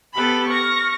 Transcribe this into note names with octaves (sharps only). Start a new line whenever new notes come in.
B3 G4 A4 B4 B5
C#6 F6 A#6